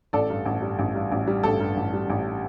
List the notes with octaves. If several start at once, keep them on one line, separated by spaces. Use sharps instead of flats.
A1 A4 D5
G2
A1
G3
A1
G2
A1
G3
A1 A4
G2
A1
G3
A1